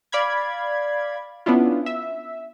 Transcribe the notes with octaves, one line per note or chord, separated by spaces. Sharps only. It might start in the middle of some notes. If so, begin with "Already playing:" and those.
D5 F5 B5 G#6
B3 C#4 D4 E4 F4
E5